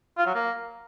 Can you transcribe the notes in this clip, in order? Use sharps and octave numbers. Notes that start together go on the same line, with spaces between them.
F4
F#3
A#3